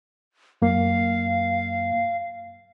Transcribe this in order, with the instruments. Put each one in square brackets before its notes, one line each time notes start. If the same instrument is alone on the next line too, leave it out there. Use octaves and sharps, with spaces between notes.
[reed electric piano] F#2 A#3 [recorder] F5